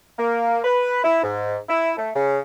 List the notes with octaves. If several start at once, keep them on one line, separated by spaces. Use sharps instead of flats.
A#3
B4
E4
G#2
E4
A3
C#3